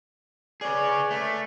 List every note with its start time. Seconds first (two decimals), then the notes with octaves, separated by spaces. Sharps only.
0.61 G#4 A#4 B4 C#5 D5
1.11 A3